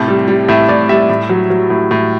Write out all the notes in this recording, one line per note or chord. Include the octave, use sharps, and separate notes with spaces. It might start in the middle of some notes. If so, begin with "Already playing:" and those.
Already playing: A2 C3 A5
G3
G3
A2 E5
A2 D5
G3 E5
A2
F#3
F#3
A2
A2